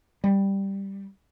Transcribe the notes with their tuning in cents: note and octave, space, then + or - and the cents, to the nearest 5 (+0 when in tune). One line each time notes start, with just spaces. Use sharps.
G3 +0